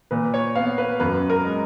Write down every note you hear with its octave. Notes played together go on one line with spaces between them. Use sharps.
A#2 B4
C#5
B3 F5
B4
F#2 B4
A#4
G#3